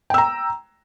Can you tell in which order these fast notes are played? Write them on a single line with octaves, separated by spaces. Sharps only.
G5 E6 A#5